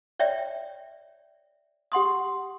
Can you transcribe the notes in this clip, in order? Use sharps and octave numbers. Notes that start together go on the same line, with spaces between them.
C#5 D5 E5 G5
G4 F#5 C6 D#6